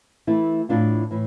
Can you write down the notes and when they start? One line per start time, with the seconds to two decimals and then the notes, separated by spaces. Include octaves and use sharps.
0.27 E3 A3 E4
0.69 A2 E3 B3 D4 F4
1.11 A2 E3